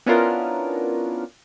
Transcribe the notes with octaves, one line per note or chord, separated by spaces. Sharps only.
B3 C#4 D4 E4 F4 A#4